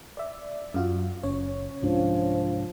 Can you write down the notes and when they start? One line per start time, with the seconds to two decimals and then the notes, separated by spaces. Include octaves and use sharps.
0.17 D5 E5
0.74 F#2 F4 F#4
1.23 F#1 C#4 C#5
1.82 C2 G#2 F3 D4